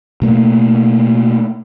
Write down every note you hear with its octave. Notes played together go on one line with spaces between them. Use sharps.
B2 A3 A#3